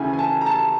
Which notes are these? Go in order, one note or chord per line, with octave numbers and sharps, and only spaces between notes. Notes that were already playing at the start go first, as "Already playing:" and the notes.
Already playing: D2 C#3 E3 G#5
G#5
A5
A#5
A5